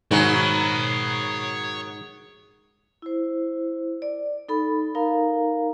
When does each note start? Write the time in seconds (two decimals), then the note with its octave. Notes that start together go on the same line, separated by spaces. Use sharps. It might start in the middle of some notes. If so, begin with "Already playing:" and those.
0.11 G#2 D#3 F#3 C#5 B5
3.02 E4 C5
4.02 D5
4.49 D#4 A4 B5
4.95 D#4 A#4 F5 A#5